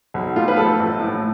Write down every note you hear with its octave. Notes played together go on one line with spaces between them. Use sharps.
B1
A2 F4
B4
F3 A4
A1
A2